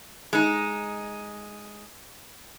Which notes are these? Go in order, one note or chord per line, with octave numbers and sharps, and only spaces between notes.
G#3 D#4